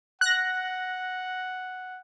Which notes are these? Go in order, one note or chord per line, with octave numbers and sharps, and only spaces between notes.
F#5 F#6 A#6